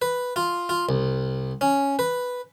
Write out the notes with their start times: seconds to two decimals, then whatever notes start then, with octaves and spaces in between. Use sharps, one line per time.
0.02 B4
0.36 F4
0.69 F4
0.89 C2
1.61 C#4
1.99 B4